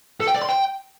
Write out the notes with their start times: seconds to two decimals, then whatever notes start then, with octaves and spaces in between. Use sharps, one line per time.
0.20 A4
0.27 G5
0.34 D5
0.42 C6
0.49 G5